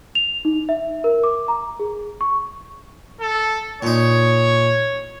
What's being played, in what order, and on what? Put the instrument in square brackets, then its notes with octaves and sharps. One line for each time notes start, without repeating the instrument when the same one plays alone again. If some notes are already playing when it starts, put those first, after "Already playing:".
[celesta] F7
D#4
E5
A#4
D6
A#5
G#4
C#6
[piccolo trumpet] A4
[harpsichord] A#2 D#4 [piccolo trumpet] C#5